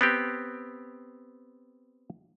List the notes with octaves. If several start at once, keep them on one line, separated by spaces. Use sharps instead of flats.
B3 C4 G4